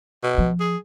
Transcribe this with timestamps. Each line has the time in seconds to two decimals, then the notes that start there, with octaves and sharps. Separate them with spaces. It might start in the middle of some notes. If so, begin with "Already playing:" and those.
0.23 B2
0.38 F3
0.60 G#4